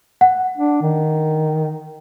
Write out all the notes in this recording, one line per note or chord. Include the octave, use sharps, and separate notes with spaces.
F#5
D4
D#3